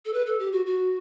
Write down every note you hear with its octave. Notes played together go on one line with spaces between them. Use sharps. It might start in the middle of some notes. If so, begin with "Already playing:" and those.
A4
B4
A4
G4
F#4
F#4